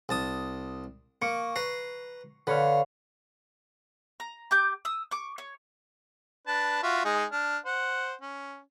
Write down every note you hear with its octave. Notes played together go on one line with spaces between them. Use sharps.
C2 A5 D#6
A#3 C#6 C#7 D7
B4 A#5 C7
D3 B4 C#5 F5
A#5
G4 D6 G6
D#6 E6
C#6 D6
C#5
D4 B4 A5
F4 F#4 E5
G#3 D#4 G#4
D4 F6
C5 F#5
C#4